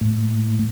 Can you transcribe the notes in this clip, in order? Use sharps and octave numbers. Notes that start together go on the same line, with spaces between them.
A2